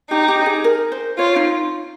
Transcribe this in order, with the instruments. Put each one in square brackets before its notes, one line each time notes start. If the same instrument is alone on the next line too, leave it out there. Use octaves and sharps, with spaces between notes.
[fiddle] D#4 [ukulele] G4
[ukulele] G4
G#4
A#4
C5
[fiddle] F4 [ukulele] C#5
[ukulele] D#4